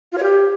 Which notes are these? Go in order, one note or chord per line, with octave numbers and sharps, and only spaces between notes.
F4
C#5
G4